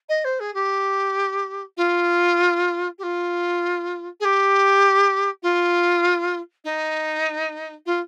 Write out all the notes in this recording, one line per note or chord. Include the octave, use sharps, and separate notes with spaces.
D#5
C5
G#4
G4
F4
G4
F4
G#4
G4
F4
D#4
F4